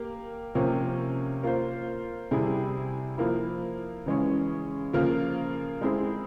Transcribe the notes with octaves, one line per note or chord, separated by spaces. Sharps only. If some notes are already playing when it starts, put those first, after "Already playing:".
Already playing: A#3 G4 A#4
C3 F3 A#3 C#4
A#3 F4 C5
C3 G3 C4 E4 G#4
F3 A#3 E4
C#3 E3 G#3 C#4
C#3 F3 A#3 F4 A#4
G#3 C4 E4 G#4